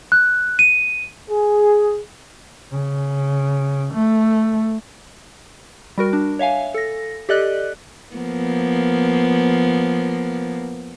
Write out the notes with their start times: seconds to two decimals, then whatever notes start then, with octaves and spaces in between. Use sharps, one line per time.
0.12 F#6
0.59 D#7
1.31 G#4
2.72 C#3
3.93 A3
5.98 G3 F#4 A#4
6.13 D4
6.39 C#5 E5 F5 G#5
6.74 A4 A#6
7.29 G4 A4 D5 D#5 F#6
8.15 F3 A#3 B3